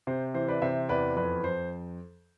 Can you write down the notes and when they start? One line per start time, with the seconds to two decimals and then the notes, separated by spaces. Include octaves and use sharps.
0.07 C3 C5
0.34 E3 C5
0.48 B4 D5
0.62 C3 C5 E5
0.89 E2 B4 D5
1.17 F2 B4
1.44 F2 C5